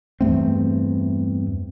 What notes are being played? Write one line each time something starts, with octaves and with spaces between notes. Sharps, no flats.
E2 G2 A3 C4